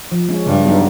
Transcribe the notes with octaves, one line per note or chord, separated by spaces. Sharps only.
F3
G#3 C#4
G2 C#3
F#3 B3 D#4